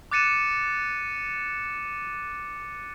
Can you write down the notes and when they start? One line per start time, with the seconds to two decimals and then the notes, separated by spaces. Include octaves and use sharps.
0.11 D6 F#6 A6 C#7 D#7 E7